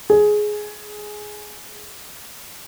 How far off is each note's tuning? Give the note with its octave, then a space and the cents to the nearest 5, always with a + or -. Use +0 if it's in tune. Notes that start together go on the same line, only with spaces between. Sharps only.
G#4 +10